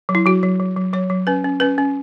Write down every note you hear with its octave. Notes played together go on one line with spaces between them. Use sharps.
F#3
E4
F#3 F#4
F#3
F#3
F#3
F#3 C#5
F#3
C#4 B4
C#4
C#4 B4
C#4